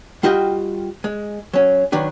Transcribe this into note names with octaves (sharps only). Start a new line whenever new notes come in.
G3 F4 F#4 D#5 G5
G#3
F#3 C#4
D#3 F#3 D4 B4